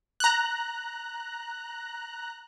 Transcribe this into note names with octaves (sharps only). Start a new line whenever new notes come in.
A#5 F#6